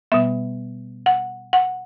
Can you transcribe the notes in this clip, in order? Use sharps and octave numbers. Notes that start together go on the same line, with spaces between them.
B2 G3 B3 E5
F#5
F#5